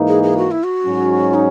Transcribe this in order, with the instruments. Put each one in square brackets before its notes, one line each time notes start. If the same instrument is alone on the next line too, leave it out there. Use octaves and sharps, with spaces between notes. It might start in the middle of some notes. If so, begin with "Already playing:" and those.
Already playing: [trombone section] G#2 E3 A#3 D#4
[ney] G#4
G#4
F#4
E4
F#4
[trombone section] G#2 F#3 C#4
[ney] D#4